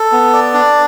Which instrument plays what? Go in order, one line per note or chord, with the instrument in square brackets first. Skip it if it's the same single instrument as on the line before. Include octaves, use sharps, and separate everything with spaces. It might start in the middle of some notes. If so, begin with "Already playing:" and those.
Already playing: [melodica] A4
B3
D5
D4